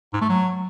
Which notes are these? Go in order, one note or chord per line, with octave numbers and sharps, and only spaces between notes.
G#2
A3
F#3